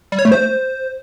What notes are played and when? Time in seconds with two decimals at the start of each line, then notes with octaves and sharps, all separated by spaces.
0.12 G3
0.19 C#5
0.25 A3
0.32 C5